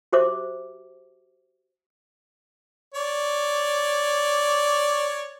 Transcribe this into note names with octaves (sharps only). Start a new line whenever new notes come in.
F#4 G4 C5 E5 D6
C#5 D5